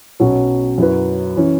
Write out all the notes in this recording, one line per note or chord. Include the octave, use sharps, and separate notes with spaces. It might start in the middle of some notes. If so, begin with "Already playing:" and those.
B1 B2 F#3 C#4
F#2 F#3 E4 B4
E3 C#4 E4